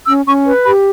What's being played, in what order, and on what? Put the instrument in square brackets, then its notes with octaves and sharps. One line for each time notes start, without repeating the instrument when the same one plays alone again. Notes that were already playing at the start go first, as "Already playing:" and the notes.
[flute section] C#4 E6
C#4 C#6
B4
G4 B5